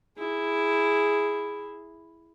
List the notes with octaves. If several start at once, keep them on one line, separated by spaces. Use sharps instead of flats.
E4 G#4